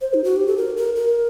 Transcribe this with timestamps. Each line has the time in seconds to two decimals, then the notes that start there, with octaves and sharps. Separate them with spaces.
0.01 C5
0.14 D#4
0.24 F#4
0.36 G4
0.47 A4
0.58 A#4
0.77 A#4
0.96 A#4